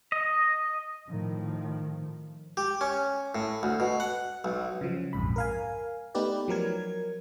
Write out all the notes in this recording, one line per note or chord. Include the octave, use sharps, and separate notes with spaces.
D#5
A2 D#3 F3
G4
C#4
A2
D2
B2
F#5
B1
C#3 F3 F#3
A#1 F2 G#2 B5
A#4 F5 G#5
A3 B3 D#4 G4 B4 D5
F3 F#3 A#4 G#6